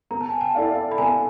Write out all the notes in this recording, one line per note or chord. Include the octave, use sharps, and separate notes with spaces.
B3 A#5
A5
G#5
G5 A5
E4 A4 D5 F5
B5
B3 G#5 A#5